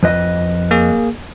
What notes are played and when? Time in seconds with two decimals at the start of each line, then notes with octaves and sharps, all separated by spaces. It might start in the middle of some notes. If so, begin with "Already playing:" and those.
0.03 F2 B4 D#5
0.71 A#3 G#4